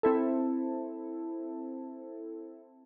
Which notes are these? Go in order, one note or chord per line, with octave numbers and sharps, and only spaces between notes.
C4 E4 A4